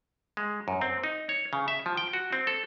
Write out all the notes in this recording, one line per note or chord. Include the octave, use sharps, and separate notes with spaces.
G#3
F#2
C4
D#4
C#5
C#3
E5
F3
G5
F#4
C4
A4